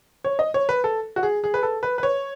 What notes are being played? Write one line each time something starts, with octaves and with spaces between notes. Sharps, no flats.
C#5
D#5
C#5
B4
A4
F#4
G#4
G#4
B4
A4
B4
B4
C#5